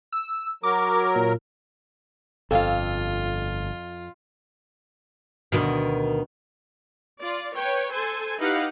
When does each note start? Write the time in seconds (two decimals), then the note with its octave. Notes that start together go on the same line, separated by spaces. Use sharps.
0.12 E6
0.63 F#3 A#4 D6
1.16 A#2
2.51 G1 F2 F4 A4 F5
5.52 D2 B2 D#3
7.21 F4 D5
7.55 B4 C#5 G5
7.93 A4 C5 G#5
8.39 D#4 E4 G4 B4 F5 F#5